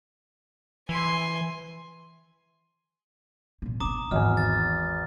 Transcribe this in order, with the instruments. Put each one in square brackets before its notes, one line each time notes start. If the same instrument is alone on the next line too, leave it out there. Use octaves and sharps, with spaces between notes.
[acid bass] E3 [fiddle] G#5 C6
[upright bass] A#2 A#3
[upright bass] C4 D4 [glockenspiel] A#5 D6 D#6
[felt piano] G#1 E2 G#5 [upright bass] G#2 G#3 [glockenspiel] F6
[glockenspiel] A6